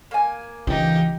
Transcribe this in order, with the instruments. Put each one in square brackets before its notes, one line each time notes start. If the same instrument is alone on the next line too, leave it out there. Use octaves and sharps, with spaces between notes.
[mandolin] A#3 G#5
[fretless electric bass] C#2 [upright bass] E3 [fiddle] D#4 G4